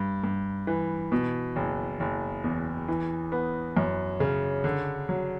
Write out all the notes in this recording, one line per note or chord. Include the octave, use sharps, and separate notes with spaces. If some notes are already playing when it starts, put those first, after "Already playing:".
Already playing: G2
G2
E3
B2
F#1
F#1
E2
E3
B3
F#2
C#3
D3
F#3